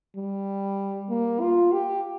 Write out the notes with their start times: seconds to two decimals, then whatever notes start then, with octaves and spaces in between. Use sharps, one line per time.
0.16 G3
1.09 A#3
1.41 F4
1.72 G4